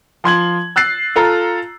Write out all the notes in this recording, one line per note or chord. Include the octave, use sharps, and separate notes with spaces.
F3 C6 G#6 F#7
E6 F#6 A6 C7
F4 A4 A#5